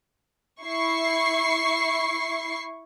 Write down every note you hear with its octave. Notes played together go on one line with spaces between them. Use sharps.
E4 C#6 C7